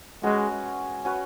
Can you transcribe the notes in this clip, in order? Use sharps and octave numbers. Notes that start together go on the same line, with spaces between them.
G#3 C#4 F#4 B4
C#4 F#4 B4